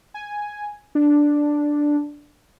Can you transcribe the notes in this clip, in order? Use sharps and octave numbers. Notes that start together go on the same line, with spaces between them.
G#5
D4